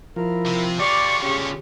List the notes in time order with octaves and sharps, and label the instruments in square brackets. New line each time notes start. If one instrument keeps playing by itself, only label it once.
[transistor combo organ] F3 [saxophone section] E4 A#4
[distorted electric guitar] C3
[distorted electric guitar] D3 F4 [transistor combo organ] G4 [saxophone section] D5 [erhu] C#6
[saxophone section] C#3 G4 [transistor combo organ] C#4